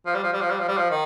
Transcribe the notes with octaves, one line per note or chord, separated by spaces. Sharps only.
F3
G3
F3
G3
F3
G3
F3
G3
F3
D#3